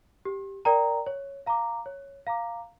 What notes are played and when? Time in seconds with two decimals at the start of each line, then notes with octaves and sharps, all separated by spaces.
0.25 G4
0.65 A#4 D5 G5 A#5
1.06 C#5
1.46 F5 A#5 D6
1.86 C#5
2.27 F5 A#5 D6